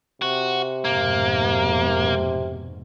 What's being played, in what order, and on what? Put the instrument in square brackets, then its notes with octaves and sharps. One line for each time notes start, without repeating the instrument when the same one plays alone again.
[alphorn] C3 [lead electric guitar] F#4
[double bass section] F1 G#2 B2 [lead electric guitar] A#3